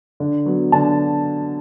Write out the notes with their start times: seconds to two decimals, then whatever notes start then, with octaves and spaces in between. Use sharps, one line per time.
0.20 D3
0.46 F#3 B3
0.72 D3 A5